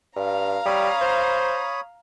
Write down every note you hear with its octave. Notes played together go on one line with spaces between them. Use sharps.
G2 F5 A#5
G3 C#5 B5 D#6
C5